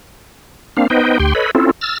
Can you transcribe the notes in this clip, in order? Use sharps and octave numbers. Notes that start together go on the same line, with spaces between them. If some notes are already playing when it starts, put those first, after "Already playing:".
A#3 C4 D4 F5
B3 D#4 B4 C5 D#5 G5
D2 G4 G5 C6
A4 B4 C#5 D#5 B5
C4 C#4 E4 F4 A4
E6 F6 A6